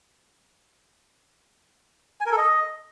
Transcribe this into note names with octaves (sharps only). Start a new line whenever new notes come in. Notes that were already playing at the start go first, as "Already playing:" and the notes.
G#5
A#4
A4
D#5